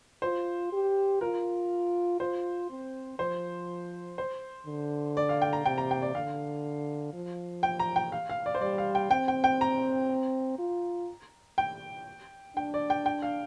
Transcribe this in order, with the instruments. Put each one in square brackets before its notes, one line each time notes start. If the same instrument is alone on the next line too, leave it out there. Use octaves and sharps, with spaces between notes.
[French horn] F4 [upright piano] C5
[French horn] G4
[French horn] F4 [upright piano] A#4
[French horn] F4 [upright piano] C5
[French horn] C4
[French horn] F3 [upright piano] C5
[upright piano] C5
[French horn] D3
[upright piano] D5
F5
G5
A#5
[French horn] C3 [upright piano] G5
[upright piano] A#5
G5
D5
[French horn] D3 [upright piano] F5
[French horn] F3
[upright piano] G5
A#5
G5
F5
F5
D5
C5
[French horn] G3 [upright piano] D5
[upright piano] F5
G5
[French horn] C4 [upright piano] G5
[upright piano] G5
G5
A#5
[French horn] F4
[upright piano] G5
[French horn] D4 [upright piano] G5
[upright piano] D5
G5
G5
F5